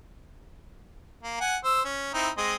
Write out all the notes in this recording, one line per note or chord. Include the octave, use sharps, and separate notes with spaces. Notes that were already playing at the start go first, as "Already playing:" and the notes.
A#3
F#5 G#5
C5 E6
C#4
C4 D#4 E4
G#3 C4 D#5